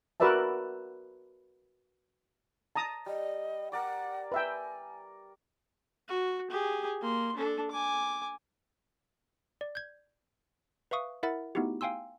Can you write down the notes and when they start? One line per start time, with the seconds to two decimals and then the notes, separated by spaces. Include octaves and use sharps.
0.20 F#4 A#4 B4 D5 E5 A5
2.76 A5 A#5 D#6
3.06 G3 D#5
3.72 A#4 D5 F#5 D6
4.32 B4 E5 G5 G#5
6.08 F#4
6.51 G4 G#4
7.02 A#3 C6
7.36 D4 A4
7.71 G#5 D6
9.61 D5
9.75 G6 G#6
10.91 B4 E5 F5 C#6 D#6
11.23 E4 A#4 E5 F#5 B5 A6
11.55 A3 B3 D#4 E4 F#4 G4
11.81 F5 G5 G#5 C6 E6